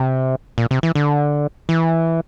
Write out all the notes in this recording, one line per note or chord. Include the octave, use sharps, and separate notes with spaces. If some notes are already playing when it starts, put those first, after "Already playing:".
Already playing: C3
A#2
C3
E3
D3
E3